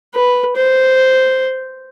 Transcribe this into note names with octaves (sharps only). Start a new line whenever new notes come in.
B4
C5